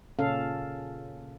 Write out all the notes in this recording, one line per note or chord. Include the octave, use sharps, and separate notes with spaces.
A#2 C#3 C#4 A4 F5